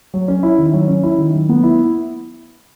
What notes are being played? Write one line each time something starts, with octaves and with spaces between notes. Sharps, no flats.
F#3
C#4
E4
D#3
F#3
C#4
E4
D#3
F#3
B3
E4